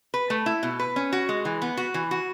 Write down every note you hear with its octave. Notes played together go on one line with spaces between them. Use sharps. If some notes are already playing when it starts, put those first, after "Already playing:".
B4
A3
E4
B2
B4
C#4
F#4
G#3
E3
B3
F#4
E3
F#4